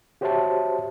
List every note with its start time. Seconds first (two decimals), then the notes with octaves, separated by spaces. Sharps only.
0.21 F#4 G4 C5 C#5 E5 A5